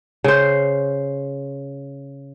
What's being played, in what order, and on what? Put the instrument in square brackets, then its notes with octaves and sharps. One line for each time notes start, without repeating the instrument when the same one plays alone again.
[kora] C#3 C5